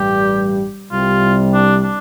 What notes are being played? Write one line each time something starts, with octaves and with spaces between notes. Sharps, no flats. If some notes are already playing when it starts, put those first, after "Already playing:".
Already playing: A1 G2 G3 G4
C2 C3 G3 F4
D4
D4